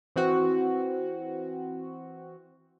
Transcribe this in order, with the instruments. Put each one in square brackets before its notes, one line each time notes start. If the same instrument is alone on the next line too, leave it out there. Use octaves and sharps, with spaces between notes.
[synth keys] E3 C4 F#4